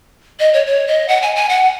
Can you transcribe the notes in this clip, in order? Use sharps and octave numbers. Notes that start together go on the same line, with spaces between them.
D#5
C#5
C#5
D#5
F#5
G#5
G#5
F#5